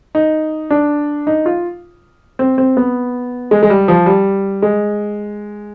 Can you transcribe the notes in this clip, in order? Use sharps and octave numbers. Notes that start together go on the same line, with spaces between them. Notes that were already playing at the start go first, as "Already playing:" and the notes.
D#4
D4
D#4
F4
C4
C4
B3
G#3
G#3
G3
F3
G3
G#3